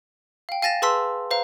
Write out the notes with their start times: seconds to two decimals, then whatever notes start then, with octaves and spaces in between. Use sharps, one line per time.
0.49 F5 G5
0.62 F5 G#5 A6 A#6 E7
0.82 G#4 B4 A5 C6 E6 B6
1.31 B4 C5 F5 A#5